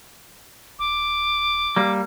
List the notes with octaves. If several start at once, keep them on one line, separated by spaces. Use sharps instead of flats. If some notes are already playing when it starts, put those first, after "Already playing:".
D#1 D6
G3 A#3